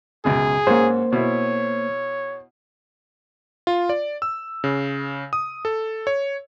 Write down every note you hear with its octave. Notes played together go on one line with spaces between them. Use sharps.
C#2 F#2 B2 G#4
G#2 A#3 C#4 C5
B2 E4 C#5
F4
D5
E6
C#3
D#6
A4
C#5